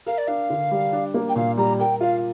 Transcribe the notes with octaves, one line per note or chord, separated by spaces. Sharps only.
A#4 F5
D5
D4 F5
D3
G3
D4
A#3
G5
A#2 F5
G3 A#5
A#4 G5
F4 F5